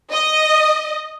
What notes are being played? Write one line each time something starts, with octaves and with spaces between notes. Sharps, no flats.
D#5